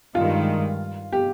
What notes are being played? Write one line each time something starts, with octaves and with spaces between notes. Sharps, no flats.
G2 D#3 G#3 F4
G4